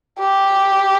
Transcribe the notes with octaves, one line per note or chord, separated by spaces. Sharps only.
G4